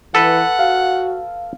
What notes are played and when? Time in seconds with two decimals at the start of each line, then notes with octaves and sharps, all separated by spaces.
0.15 E3 A4 B4 F#5
0.59 F#4 F5